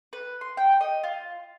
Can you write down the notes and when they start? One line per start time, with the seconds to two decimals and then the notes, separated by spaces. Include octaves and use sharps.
0.13 B4
0.41 C6
0.57 G5
0.81 D#5
1.04 F4